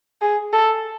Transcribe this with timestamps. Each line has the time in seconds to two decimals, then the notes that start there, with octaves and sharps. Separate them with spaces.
0.22 G#4
0.53 A4